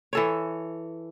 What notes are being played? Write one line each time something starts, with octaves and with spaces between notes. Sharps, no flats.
E3 A4 C#5